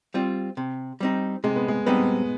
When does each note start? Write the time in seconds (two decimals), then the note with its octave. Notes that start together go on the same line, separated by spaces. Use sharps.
0.14 G3 C4 F4
0.57 C3
1.00 G3 C4 D#4
1.44 C3 G#3
1.56 B3
1.68 G#3
1.86 G3 B3 C4 D#4